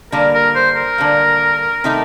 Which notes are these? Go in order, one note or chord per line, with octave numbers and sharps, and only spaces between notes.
D3 G3 A#3 A#4
A#4
C5
A#4
D3 G3 A#3
C3 D#3 A3 D#4